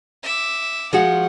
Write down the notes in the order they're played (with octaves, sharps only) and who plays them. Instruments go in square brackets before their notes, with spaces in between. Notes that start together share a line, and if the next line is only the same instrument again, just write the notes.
[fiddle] E5 D6
[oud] F3 G#3 F#4 [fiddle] F#5